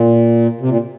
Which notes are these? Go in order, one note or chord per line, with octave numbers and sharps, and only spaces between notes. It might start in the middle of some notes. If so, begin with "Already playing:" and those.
Already playing: A#2
C3
A#2